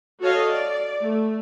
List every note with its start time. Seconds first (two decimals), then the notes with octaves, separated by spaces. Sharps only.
0.21 F#4 A4 C#5 D#5 F5
0.50 D5
1.00 A3